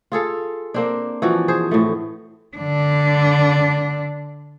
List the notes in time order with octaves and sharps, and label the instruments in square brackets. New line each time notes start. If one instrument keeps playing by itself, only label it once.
[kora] F4 G#4 A4 F5
A#3 C4 D4
E3 F3 F#4
G#4 C5
A2 A3
[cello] D3 D4